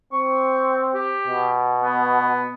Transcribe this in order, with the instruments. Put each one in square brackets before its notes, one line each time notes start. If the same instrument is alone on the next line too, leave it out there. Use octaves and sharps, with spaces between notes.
[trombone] C4 [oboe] C#6
[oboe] G4
[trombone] B2
[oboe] B3